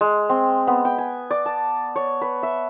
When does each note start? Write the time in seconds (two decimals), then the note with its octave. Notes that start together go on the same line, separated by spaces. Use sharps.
0.01 G#3
0.29 C4
0.67 B3
0.85 G5
0.98 G#5
1.31 D5
1.46 A5
1.96 C#5
2.22 B4
2.43 E5